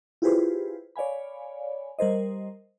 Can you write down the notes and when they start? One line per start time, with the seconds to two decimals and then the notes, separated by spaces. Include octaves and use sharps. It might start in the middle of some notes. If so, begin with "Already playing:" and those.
0.22 E4 F4 G4 G#4 B4 C5
0.96 C#5 D5 F5 G#5 B5
1.99 G3 A#4 C5 D#5